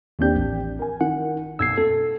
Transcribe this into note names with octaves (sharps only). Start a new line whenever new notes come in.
D#2 C4 D4 G4 G6
A1
A#4 G#5
D#3 F#5
B1 E6 G#6 C7
A3 A4